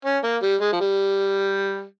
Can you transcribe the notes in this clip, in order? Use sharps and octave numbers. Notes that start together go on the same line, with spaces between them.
C#4
A#3
G3
G#3
F3
G3